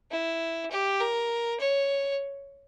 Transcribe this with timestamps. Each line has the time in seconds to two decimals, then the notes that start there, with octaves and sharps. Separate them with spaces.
0.11 E4
0.71 G4
1.00 A#4
1.60 C#5